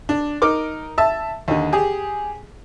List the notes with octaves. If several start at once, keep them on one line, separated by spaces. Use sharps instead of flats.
D4
D#4 A#4 D6
E5 A5
D#2 D3
G4 G#4